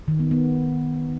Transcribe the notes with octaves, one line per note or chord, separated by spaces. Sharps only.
D#3
B3
B3